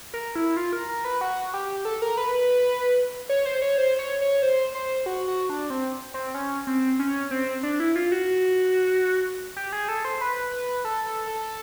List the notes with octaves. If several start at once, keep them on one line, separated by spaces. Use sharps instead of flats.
A#4
E4
F4
A#4
A#4
B4
F#4
G4
A4
A#4
B4
B4
C#5
C5
C#5
C5
C#5
C#5
C5
C5
F#4
F#4
D4
C4
C4
C#4
C4
C#4
C4
D4
E4
F4
F#4
G4
G#4
A4
C5
B4
B4
A4
A4
A4